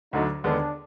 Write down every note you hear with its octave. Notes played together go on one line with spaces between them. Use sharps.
D2 D3 F#3 D4 D#4
D#2 D3 G#3 B3 D4